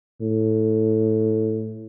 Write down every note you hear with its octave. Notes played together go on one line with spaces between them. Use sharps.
A2